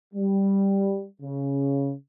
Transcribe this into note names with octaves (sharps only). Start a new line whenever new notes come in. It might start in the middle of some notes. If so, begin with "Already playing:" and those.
G3
C#3